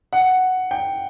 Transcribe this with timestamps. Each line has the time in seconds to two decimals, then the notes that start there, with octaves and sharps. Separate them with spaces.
0.13 F#5
0.71 G5